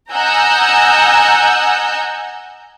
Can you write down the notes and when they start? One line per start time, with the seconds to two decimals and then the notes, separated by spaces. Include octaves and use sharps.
0.12 D#5 F#5 G#5 A#5 E6 G6